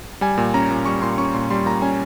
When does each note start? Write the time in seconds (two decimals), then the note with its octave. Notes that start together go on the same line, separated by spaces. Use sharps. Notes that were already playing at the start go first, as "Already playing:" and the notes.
0.21 G3 G#5
0.38 A#2
0.54 C#4 A#5
0.71 A#2
0.86 G3 C#6
1.02 A#2 C6
1.18 C#4 C#6
1.34 A#2 C6
1.50 G3 C6
1.66 A#2 A#5
1.82 C#4 G#5